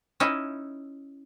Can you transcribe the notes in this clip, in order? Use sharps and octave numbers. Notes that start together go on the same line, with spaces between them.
C#4 D#4 E4